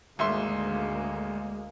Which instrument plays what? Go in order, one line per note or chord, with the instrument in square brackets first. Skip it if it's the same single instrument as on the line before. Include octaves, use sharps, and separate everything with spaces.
[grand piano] G#1 E5 C6 [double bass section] D2 G#3 A#3